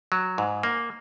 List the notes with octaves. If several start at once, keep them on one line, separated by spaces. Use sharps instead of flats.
F#3
G#2
A#3